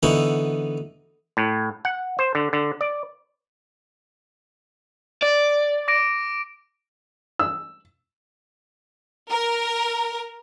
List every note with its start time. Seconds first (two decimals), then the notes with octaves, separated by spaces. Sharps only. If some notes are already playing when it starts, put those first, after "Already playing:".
0.03 D3 E3 B3 D#4 F#4 A4
1.37 A2
1.85 F#5
2.19 C5
2.35 D3
2.53 D3
2.81 D5
5.22 D5
5.88 D6 A#6 D7
7.39 E6
9.28 A#4